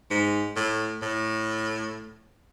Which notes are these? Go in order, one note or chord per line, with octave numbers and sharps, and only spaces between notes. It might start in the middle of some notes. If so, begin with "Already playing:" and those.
G#2
A2
A2